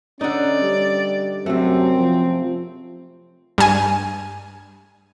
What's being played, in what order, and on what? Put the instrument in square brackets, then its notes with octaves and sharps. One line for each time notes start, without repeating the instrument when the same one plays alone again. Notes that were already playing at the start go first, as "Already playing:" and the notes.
[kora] D3 D#4 [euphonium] C#4 [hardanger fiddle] D5
[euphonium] G3
[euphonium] F#2 [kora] C3 A3 [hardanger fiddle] C4
[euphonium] F3
[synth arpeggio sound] G2 G#5